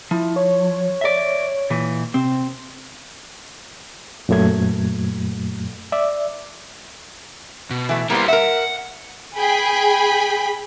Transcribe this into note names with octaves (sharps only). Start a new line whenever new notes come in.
F3 E4
C#5
D5 E5
A#2 E3
C3 C4
F#2 A#2 F#3 A3 G#6
D5 E5
B2
E3 A3
G3 A#3 B3 E4 C5
A#4 E5 F#5
G#4 G5 G#5 B5